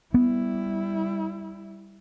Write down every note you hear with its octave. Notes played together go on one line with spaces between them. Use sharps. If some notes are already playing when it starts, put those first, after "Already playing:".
G3 B3 E4